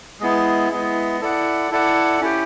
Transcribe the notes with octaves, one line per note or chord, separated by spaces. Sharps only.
G#3 B3 E4
G#3 B3 E4
E4 A4 D5 F#5
E4 A4 D5 F#5
C#4 E4 G4